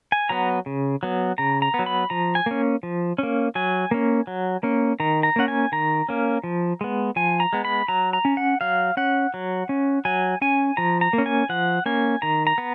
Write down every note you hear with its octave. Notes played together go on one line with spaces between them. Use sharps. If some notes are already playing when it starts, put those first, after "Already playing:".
G#5
F#3 B3 A#5
C#3
F#3 B3
C#3 A#5
A#5
B3
F#3
B5
F3 A#5
G#5
A#3 C#4
F3
A#3 C#4
F#3 G#5
A#3 C#4
F#3
A#3 C#4
D#3 A#5
A#5
A#3 C#4 F#5
G#5
D#3 A#5
A#3 C#4
F3
G#3 B3
F3 G#5
A#5
G#3 B3
B5
F#3 A#5
A#5
C#4
F#5
F#3 F5
C#4 F#5
F#3
C#4
F#3 G#5
C#4 G#5
F3 A#5
A#5
A#3
C#4
G#5
F3 F#5
A#3 C#4 G#5
D#3 A#5
A#5
B3